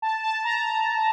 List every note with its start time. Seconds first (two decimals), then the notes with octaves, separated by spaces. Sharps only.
0.02 A5
0.23 A5
0.44 A#5